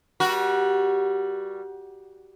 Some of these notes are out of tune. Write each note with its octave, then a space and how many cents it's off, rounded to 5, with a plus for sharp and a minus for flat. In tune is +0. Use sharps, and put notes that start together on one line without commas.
G3 +0 F#4 +0 A#4 +45